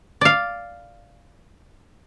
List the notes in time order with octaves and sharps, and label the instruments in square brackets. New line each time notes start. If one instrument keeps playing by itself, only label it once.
[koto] D5 F5